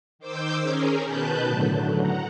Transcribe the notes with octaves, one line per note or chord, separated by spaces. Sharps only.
D#3 C5 D6 E6 G6
C#4 G#4 A#4
B2 D#3 B4 A5 F#6 G6
A2 D3 F#3
F#5 A#5